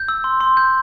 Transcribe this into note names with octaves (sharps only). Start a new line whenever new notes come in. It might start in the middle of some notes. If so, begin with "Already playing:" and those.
Already playing: G6
E6
C6
C6
G6